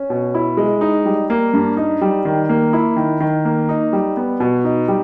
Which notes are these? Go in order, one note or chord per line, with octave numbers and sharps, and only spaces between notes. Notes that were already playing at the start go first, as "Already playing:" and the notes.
Already playing: C#4
B2
E4
G#3
D#4
G3
A#3
G2
D#4
G3
D#3
A#3
E4
D#3
D#3
A#3
D#4
G3
B3
B2
D#4
G3